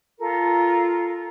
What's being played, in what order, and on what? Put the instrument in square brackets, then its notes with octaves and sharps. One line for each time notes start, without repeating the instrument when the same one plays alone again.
[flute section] F4 A4 A#4